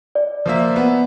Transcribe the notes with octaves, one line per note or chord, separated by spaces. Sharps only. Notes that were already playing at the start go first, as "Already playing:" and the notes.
D5
F3 A#3 E5
B3